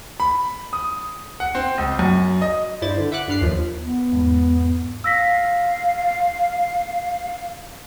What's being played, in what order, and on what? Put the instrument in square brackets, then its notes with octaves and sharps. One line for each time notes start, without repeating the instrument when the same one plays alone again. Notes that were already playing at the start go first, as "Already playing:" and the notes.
[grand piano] B5
D#6
F#5
C4
C#2
F#2
D#5
[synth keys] G2 E4 C5 D5 A6
D3
E5 F#5 D6 F#6
G2 D4 B5 F6 F#6 C7
D#2 F3
[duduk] B3
[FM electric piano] E2 G#2
[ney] F5 [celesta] E6 A#6 B6